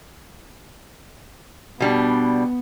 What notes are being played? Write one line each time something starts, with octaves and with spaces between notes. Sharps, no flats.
B2 G3 B3 D4